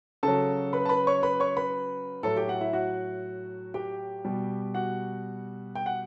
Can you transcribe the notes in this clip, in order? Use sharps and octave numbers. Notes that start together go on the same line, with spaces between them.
C#3 F#3 A4 A5
B4 B5
A5
B4 B5
C#5 C#6
B4 B5
C#5 C#6
B4 B5
A2 F#3 A4 A5
G4 G5
F#4 F#5
E4 E5
F#4 F#5
G4 G5
B2 G3
F#4 F#5
G5
F#5